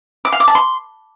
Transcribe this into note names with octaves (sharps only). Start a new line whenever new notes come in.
D6
F5
D6
A5
C6